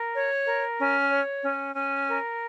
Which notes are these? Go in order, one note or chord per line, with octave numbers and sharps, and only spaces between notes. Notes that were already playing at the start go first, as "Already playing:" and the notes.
Already playing: A#4
C#5
A#4
C#4
C#5
C#4
C#4
A#4